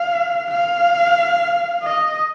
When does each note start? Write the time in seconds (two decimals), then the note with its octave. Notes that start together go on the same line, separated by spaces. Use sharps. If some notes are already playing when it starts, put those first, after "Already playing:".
Already playing: F5
0.50 F5
1.83 D#5